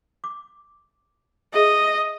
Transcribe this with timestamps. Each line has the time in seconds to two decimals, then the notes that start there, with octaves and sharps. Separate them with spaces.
0.24 D6
1.54 G#4 D#5 E5